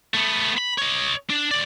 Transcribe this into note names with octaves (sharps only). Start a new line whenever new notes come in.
A3 B3
B5
C#5 D#5
D4
D#2 D5